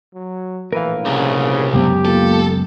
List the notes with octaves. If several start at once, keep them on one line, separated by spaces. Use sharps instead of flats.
F#3
A#1 A2 E3 A#4 B4 F5
C2 C#3
C#2 F#2 B3 G4
A#3 F4 A4